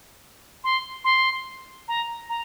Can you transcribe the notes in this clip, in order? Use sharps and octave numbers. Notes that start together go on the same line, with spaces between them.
C6
C6
A#5
A#5